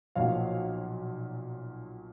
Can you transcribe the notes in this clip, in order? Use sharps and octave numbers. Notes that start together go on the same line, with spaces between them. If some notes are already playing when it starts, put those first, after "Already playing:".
B1 A#2 F3 C#5 F5